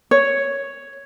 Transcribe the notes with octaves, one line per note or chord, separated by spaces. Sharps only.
C#5